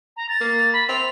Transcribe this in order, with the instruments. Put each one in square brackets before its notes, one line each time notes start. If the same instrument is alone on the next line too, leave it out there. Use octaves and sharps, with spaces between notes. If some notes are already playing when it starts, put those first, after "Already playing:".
[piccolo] A#5
A6
[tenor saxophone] A#3
[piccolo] B5
[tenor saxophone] C4 [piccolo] F7